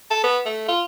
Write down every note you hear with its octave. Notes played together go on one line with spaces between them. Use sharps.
A4
B3
A3
F4